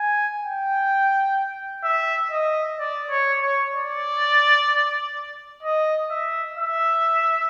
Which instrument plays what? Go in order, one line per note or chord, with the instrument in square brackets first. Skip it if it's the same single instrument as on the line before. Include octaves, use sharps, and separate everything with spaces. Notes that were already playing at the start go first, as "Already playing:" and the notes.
Already playing: [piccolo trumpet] G#5
G5
E5
D#5
D5
C#5
C#5
D5
D#5
E5
E5